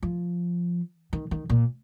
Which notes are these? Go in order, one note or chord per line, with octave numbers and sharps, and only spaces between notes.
F3
D#3
D#3
A#2